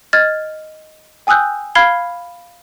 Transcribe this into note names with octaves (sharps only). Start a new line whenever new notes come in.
D#5 F6 G#6 A6
G5 G#5 D#6 E6 F#6 G6
F5 B5 F6 G#6 C7 G7